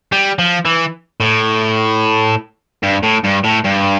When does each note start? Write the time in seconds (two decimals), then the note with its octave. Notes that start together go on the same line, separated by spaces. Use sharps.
0.12 G3
0.39 F3
0.65 E3
1.20 A2
2.83 G2
3.03 A2
3.24 G2
3.44 A2
3.64 G2